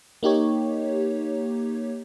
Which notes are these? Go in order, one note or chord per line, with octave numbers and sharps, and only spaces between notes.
A#3 D#4 G4 C#5